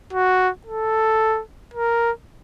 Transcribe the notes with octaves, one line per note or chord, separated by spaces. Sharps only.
F#4
A4
A#4